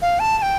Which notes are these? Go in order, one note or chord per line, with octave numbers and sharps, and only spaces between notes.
F5
A5
A5
G5